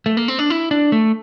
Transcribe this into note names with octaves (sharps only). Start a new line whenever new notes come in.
A3
A#3
C4
D4
E4
D4
A3